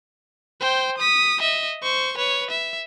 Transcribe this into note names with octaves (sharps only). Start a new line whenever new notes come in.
C5 G5
D#6 B6
D#5 E5
C5 C#6
B4 C#5
E5